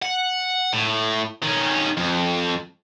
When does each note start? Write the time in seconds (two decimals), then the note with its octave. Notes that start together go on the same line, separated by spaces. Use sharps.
0.02 F#5
0.73 A2
1.43 D#3 C#4
1.97 F2